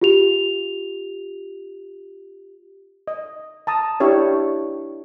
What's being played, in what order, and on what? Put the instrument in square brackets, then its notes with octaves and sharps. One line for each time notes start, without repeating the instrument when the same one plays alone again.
[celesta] F4 G4 F7
[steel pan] D#5
A5 A#5 D#6
D4 E4 G4 C#5